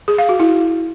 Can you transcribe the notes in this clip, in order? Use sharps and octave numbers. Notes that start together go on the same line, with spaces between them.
G#4
F5
F#4
E4